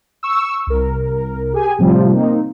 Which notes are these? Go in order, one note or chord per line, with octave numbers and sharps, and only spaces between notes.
C#6 E6
C2 A#4
G4 G#4 G#5
A2 C3 F3 G3
A#3 C4 D#4